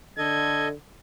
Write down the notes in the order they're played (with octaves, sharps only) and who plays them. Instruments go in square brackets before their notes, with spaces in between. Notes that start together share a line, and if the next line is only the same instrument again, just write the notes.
[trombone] D3 [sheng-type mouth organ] A4 D#5 [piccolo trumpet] G#6